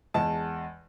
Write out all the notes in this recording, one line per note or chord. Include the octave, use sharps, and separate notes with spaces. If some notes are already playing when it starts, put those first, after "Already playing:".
E2 G#3 A5